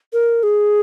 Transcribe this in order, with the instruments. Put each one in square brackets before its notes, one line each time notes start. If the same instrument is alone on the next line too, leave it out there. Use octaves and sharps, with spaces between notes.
[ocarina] A#4
G#4